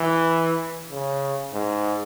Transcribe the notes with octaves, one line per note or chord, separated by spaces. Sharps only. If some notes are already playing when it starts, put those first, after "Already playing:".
Already playing: E3
C#3
G#2